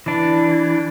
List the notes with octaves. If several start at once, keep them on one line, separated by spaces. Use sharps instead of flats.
E3 D4